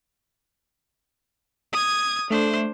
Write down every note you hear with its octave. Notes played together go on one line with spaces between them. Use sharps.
D#6 G#6
A3 D4 C5